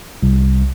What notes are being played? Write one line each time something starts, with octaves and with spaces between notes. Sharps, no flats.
C2